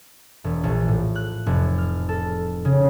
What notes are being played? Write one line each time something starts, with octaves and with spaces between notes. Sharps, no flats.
E1
A#1
A2
F#6
F1
F6
A4
C#3